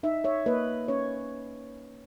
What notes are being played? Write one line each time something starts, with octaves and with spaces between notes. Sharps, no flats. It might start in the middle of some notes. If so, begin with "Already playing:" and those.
D#4 E5
C#5 E5
A#3 B4 D#5
C#4 C#5